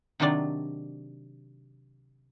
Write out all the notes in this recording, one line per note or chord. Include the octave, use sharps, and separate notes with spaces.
C3 D#3 F#3 C4 D4 D5